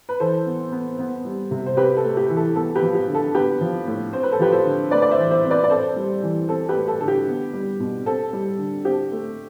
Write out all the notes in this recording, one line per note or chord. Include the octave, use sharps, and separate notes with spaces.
B4
E3 A4 C5
B3
B3
B3
G3
C3
C5
C4 G4 B4
A4
A3
G4
E3
A4
B3 A4
G4 B4
F3
G4
D3
A4
B3 G4 B4
F3
A2
C4 C5
B4
A4
F3 G4 B4
A4 C5
D3
A3 B4 D5
D5
C5 E5
E3
C5 E5
C4
B4 D5
D5
C4 A4 C5
G3
E3
C4 A4
G4 B4
A3
A4
D3 A4
G4
B3
G3
B2
C4 A4
G3
D3
C4 G4
A3